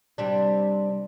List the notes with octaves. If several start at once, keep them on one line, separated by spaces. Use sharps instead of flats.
C3 G3 D4